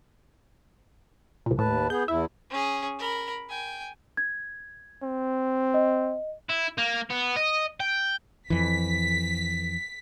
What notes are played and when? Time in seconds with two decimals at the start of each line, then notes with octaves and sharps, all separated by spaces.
1.46 C2 A#2
1.59 D#2 A2 B4 A5
1.90 B3 G#4 G6
2.08 E2 E4 E5
2.50 C#4 G#4
2.99 A#4 B5
3.50 G5 G#5
4.17 G#6
5.03 C4
5.74 D#5
6.50 E4
6.78 A#3
7.10 B3
7.36 D#5
7.80 G5
8.50 F2 E3 B6